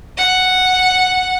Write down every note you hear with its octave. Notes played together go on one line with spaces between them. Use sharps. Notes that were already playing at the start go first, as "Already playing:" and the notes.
F#5